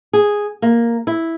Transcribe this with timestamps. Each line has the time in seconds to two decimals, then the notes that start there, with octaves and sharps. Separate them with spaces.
0.13 G#4
0.62 A#3
1.07 E4